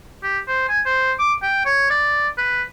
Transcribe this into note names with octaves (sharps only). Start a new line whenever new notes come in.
G4
C5
G#5
C5
D6
G5
C#5
D5
B4